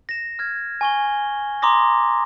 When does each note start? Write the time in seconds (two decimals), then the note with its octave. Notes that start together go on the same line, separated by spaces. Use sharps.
0.09 A#6 E7
0.39 F6 G#6
0.81 G#5 C#6 G7
1.62 A#5 C6 D6 D#6 A#6